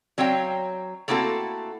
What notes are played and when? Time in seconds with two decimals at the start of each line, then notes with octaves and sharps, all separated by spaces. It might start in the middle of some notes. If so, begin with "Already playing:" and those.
0.18 F#3 C4 C#5 F5 G5
1.08 A3 A#3 C4 E4 F#4 A4